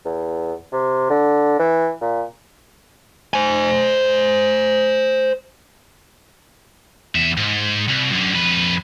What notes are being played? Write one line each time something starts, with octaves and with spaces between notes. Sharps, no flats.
E2
C3
D3
E3
A#2
C5 G#5
E2 E5
G#2
C2
F#2 D3
F2 B4